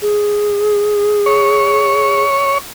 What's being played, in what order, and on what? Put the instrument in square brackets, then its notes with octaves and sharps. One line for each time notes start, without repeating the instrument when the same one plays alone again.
[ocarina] G#4
[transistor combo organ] C#5